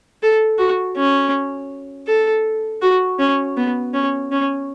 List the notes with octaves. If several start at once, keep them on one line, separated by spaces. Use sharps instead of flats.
A4
F#4
C#4
A4
F#4
C#4
B3
C#4
C#4